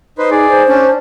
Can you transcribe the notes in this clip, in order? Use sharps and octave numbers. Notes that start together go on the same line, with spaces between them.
D#4 B4 C5
D#4 G#4 D5
C5
C#4 D4